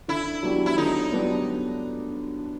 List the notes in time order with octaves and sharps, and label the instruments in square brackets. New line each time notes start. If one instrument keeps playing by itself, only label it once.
[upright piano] D3 [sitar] E4
[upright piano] F#3 B3 D4 G4
[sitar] E4
[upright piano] D3 [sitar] D#4
[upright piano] F#3 B3 D4 G4